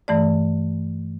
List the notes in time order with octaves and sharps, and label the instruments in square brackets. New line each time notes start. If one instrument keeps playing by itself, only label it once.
[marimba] G2 E3 A3 D5